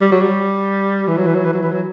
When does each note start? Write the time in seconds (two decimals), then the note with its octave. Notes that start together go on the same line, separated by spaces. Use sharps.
0.01 G3
0.11 F#3
0.21 G3
1.08 E3
1.17 F#3
1.26 E3
1.35 F#3
1.45 E3
1.53 F#3
1.63 E3
1.72 F#3